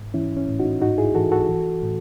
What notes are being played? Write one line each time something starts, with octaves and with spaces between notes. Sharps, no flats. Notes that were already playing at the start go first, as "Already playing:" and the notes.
Already playing: G#2
E3 C#4 E4
C#4
A2
D#4 F#4
G#2 D#4 F#4
E4 G#4
E3 F#4 A4
F#4 A4
E3
A2